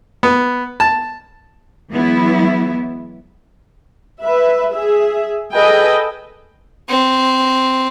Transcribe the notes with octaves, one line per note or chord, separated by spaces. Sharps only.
B3
A5
E3 F#3 G#3 B3 E4
B4 E5
G#4 E5
G#4 A4 B4 D#5 G5 G#5
C4